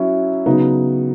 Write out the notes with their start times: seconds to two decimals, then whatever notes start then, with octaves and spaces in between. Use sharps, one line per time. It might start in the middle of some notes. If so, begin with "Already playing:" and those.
Already playing: F#3 C#4 E4
0.46 C#3 F#3 B3 D#4